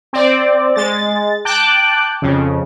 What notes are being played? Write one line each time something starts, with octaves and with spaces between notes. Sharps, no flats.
C4 D5
G#3 A6
G5 A5 D6 F#6
F2 C#3